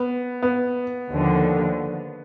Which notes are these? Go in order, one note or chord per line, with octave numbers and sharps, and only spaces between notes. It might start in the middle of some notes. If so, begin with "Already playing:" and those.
Already playing: B3
B3
D#2 D3 F3